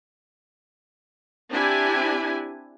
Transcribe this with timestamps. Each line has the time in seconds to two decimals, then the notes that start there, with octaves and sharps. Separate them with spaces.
1.51 C4 D4 E4 G4 G#5